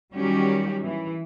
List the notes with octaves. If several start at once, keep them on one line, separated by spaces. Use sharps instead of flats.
D#3 F#3 G3 C#4 F#4 G4
E3